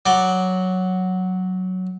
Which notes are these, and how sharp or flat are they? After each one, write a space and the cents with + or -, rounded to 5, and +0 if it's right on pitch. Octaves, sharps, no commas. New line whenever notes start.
F#3 +0 D5 +0